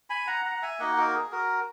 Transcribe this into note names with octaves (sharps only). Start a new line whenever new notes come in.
G#5 B5
F#5 A#5
F#5 A#5
F#5
E5 G#5
A#3 D#4 F#4 D#5 F#5
F#4 A#4
G#4
F#4 A#4